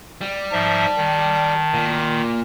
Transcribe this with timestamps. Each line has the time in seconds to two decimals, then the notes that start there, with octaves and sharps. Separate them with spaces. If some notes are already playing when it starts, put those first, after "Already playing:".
0.21 G3
0.52 G#2 F3 E5 A5
0.97 D#3
1.74 A#2